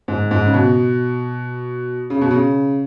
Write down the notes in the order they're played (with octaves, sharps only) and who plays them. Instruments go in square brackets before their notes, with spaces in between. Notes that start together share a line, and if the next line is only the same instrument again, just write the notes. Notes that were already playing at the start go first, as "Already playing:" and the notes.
[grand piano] G#2
G#2
C#3
B2
C#3
B2
C#3